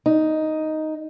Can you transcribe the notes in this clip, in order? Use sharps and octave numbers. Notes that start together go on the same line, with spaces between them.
D#4